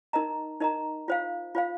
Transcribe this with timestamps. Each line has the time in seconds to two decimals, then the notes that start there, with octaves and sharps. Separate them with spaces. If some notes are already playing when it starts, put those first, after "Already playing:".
0.13 D#4 A#4 D#5 A#5
0.61 D#4 A#4 D#5 A#5
1.08 F4 C5 F5
1.55 F4 C5 F5